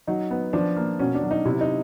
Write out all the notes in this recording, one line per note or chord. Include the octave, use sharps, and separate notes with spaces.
F#3 D#4
B3
F3 D4
A#3
B2 C#4
D4
F#3
D#4
C3 E4
D#4